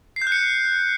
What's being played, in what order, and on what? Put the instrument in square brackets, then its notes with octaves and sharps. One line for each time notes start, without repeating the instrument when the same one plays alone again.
[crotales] C7
G6
F#6
C#7